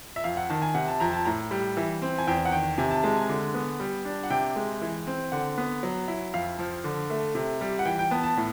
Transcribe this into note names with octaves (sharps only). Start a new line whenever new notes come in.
E5
F2 F5
F#5
D#3 A5
G#5
C3 F#5
A5
F2 A#5
A5
A2 A#5
G3
E3
C4
G#5
E2 G5
F#5
D#3 G5
C3 G#5
A5
G#3 A5
G#5
D3
B3
G3
D4
F#5
C3 G5
G#3
E3
C4
D3 F#5
B3
F#3
E4
F2 F5
F3
D3
A3
C3
G3
F#5
E3 G5
G5
B3 A5
A5
A2